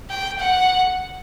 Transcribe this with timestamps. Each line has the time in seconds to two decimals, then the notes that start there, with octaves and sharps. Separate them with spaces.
0.10 G5
0.40 F#5